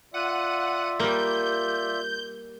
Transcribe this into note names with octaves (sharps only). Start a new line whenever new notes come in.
F4 D5 E5 F#5 D#7
G3 A#3 G6